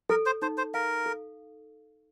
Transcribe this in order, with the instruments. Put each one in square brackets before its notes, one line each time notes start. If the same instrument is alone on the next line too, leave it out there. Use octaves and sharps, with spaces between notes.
[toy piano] A4 [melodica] A#4
[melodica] C5
[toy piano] D#4 [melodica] C5
[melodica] C5
[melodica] A#4 [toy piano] F5
[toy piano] A4